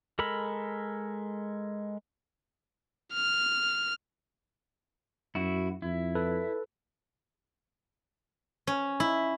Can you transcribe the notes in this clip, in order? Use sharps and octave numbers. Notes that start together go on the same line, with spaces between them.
G#3 A4 A#4 B5
F6
F#2 E4 F#4
F2 E4
A4 B4
C#4
E4